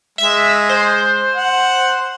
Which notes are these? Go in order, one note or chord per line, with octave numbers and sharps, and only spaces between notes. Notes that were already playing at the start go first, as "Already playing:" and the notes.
G#3 E5
C5
F#5